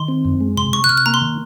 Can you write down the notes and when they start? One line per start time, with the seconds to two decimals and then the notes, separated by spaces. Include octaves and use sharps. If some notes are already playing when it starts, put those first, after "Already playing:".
Already playing: D#3 C6
0.08 C4
0.25 F#2
0.41 G#3
0.57 C3 C6
0.73 C3 C#6
0.84 F#6
0.89 C3 F6
0.98 F#6
1.06 A#3 A#5
1.14 C6
1.22 D#3